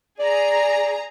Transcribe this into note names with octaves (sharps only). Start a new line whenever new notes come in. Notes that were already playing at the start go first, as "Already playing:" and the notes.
G#4 D5 A#5